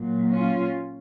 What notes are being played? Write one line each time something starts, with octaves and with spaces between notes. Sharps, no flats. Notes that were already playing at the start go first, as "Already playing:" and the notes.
Already playing: A#2 F#3
C#4 F4